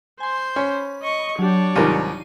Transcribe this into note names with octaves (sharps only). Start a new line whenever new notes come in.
C5 G#5 C6
C#4 B5
D#5 C#6
F#3 D4 G4 C#5
C2 G#2 D#3 F4 A#4 D#7